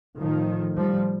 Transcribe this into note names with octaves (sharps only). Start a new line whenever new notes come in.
A2 D#3 F3
F3 G3